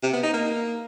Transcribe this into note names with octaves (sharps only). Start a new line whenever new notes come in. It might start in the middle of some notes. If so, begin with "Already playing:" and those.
C3
B3
D#4
A#3